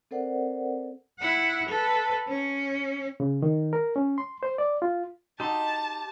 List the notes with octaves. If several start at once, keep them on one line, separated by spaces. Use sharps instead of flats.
C4 A4 A#4 C5 D5 F#5
E4 F#5
A4 B4
C#4
C#3
D#3
A#4
C#4
C6
C5
D5
F4
D#4 F#4 G4 F#5 A5 C6